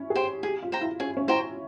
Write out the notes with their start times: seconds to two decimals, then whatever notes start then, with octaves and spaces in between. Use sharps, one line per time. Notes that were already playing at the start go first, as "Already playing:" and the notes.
Already playing: C#4 E4
0.10 G#4
0.15 G4 C5 G5 C6
0.43 G4 G#4
0.63 F4
0.72 C5 G5 A#5
0.81 E4
1.00 C#4 G#4
1.17 C#4
1.28 E4 C5 G5 A#5